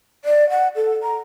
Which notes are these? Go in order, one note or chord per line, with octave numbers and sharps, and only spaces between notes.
D5
F#5
A4
A#5